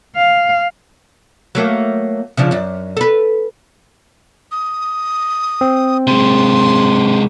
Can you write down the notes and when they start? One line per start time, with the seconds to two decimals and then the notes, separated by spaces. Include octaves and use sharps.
0.16 F5
1.55 F#3 A3 A#3
2.37 C#3 F3 D4
2.51 F#2 D4
2.97 A4 B4
4.52 D#6
5.61 C4
6.07 C3 G#3 C6